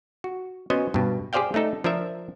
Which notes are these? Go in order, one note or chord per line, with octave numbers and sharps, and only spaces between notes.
F#4
B3 C#4 F#4 C5 D#5 G#5
G2 B2
G4 G#4 C5 D5 F5 G5
A3 D4 D#4 A4
F3 D4 A#4 E5